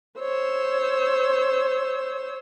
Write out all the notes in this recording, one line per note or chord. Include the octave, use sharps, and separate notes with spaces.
C5 C#5 E6